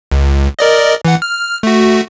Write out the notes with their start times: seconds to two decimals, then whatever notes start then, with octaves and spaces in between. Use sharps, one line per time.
0.12 C#2
0.59 A#4 D5 D#5
1.05 E3 F#5
1.22 F6
1.63 A3 F#4